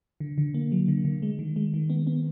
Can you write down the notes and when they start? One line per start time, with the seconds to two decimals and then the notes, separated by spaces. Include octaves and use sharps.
0.20 D3
0.38 D3
0.54 A#3
0.72 F#3
0.88 D3
1.05 D3
1.22 G#3
1.39 D#3
1.56 G#3
1.74 D#3
1.90 B3
2.07 B3